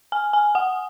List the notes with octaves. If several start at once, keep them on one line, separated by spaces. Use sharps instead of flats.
G#5
G#5
F#5